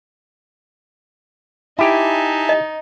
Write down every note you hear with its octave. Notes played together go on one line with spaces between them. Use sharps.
D#4 E4 G4 E5 G#5 A5
D#5